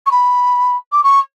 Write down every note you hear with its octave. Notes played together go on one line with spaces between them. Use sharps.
C#6
B5
D6
C#6